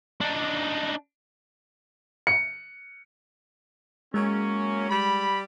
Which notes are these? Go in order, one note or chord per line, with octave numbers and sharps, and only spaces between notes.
D4 D#4
C#7
F#3 G#3 A#3 C#4
G3 B5